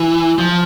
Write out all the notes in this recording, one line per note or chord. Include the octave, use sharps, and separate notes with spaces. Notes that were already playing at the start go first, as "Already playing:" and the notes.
Already playing: E3
F3